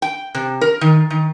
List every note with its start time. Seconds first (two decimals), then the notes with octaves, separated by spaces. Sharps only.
0.02 G5
0.35 C3
0.61 A#4
0.81 D#3
1.10 D#3